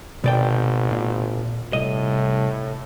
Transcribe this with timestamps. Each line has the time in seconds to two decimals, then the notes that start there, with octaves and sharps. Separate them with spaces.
0.24 G#1 B2 D5 G5
0.91 A#2
1.73 C2 A2 D#5